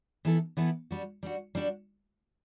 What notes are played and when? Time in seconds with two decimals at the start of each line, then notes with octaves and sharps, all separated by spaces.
0.25 E3 B3 E4 A4
0.57 E3 B3 E4 A4
0.91 G3 D4 F#4
1.23 G3 D4 F#4
1.55 G3 D4 F#4